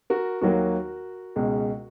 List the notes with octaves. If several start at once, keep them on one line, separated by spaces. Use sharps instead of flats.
F#4 A#4
D#2 D#3 F#3 A#3 F#4 A#4
C#2 B2 G#3